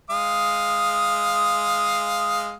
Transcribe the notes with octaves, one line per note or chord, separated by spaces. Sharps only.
G#3 F5 D#6